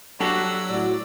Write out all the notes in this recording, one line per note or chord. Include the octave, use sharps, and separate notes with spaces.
F#3 D4 F#4 G4 A4 E6
A2 F#4 D5